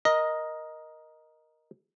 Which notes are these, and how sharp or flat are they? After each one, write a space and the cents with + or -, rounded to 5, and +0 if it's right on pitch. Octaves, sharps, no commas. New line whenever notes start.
A#4 +10 D#5 +0